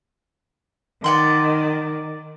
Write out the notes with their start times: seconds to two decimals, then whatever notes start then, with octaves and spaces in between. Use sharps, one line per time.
1.04 D#3 D5 F#5 C6